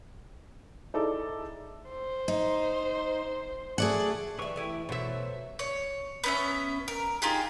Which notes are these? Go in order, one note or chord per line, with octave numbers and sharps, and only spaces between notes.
D#4 E4 G#4 A4 D5 D6
C5
D#4
A3 G#4 D5 F#5
E3 G4 B4 E5 C#6
A3 E4 G4
B2 F#3 A3 C5 E5
C#5
B3 C#4 E5
A#4
D#4 F4 G4 G#4